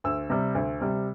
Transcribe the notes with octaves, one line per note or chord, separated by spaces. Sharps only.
D2 E6
C3 G3
D2
C3 G3